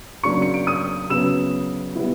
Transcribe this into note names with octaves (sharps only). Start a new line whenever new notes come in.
C#3 F#3 A#3 D4 C#6 C#7
C#7
D7
D#6 D#7
C#3 F#3 B3 E6 E7
G3 B3 E4